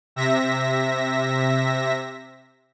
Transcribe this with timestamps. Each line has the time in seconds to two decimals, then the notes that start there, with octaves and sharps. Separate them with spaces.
0.16 C3 E5 A#6 B6